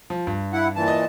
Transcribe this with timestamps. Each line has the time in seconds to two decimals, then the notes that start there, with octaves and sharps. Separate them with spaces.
0.10 F3
0.27 G2
0.53 E4 F#5
0.76 A#2 E3 A5
0.88 D#5